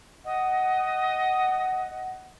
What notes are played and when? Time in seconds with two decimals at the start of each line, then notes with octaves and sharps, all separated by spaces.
0.25 D#5 F#5